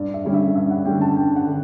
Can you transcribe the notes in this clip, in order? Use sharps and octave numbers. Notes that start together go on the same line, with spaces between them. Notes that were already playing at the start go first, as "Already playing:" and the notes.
Already playing: G2 D5
E5
D3 G3 C#4
E5
G2 E5
F#5
D3 G3 C#4 G5
A5
G2 G5
F#5
D3